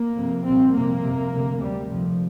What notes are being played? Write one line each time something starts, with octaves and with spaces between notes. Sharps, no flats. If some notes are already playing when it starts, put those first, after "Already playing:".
Already playing: A#3
F2 C3
C2 A#2 C4
F2 C3 A#3
F2 C3
D2 C3
D2 C3 G3
F2 C3 F3